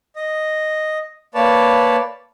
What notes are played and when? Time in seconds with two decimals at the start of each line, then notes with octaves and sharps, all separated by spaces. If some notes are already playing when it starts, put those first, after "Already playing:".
0.16 D#5
1.35 A#3 B4 C#5 D5 A5